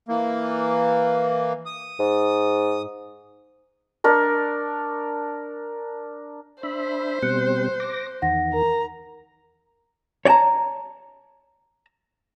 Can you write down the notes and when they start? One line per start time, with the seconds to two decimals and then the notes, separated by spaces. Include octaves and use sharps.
0.08 E3 A#3
1.66 D#6
1.99 G#2
4.04 D4 A#4 C#6
6.63 D4 C5 E5 B5
7.22 B2 G3 C4 F#6 C#7
7.80 D6 A#6
8.22 E2 D#3 F#5 A#6
8.54 A#4 A#5
10.25 C#5 D5 G5 A5 A#5